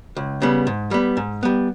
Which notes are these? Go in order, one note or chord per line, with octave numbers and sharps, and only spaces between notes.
C#2
C#3 G3 B3
G#2
G3 B3
G#2
G3 B3